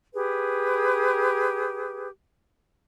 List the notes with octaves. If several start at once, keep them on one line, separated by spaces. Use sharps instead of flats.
G4 G#4 B4